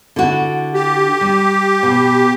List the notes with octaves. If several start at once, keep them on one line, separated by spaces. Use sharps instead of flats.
D3 E4 F#4
G4
G3
B2